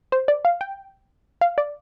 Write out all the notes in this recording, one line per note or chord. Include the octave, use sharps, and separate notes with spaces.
C5
D5
F5
G5
F5
D5